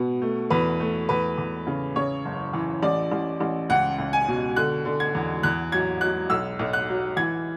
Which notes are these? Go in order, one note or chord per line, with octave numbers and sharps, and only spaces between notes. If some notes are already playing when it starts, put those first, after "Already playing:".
Already playing: B2 B3
A3
E2 B4
A3
E2 B4
E2
C#3
C#3 C#5
F#1
E3
A1 D5
A1
A1
C#2 F#5
C#2
G#5
B2
D3 F#6
D3
G#6
E2
E2 F#6
F#3 G#6
F#3 F#6
B1 E6
B1
F#6
F#3
E3 G#6